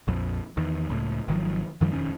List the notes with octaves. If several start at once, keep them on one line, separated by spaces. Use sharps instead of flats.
A#1 F2
E2 D#3
C#2 A2
G#1 D#3 F3 F#3
F#2 D#3 F3 G3
E1 F2 D#3 C#4